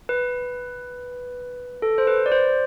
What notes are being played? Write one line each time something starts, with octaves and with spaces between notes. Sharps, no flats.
B4
A4
C5
B4
D5
C5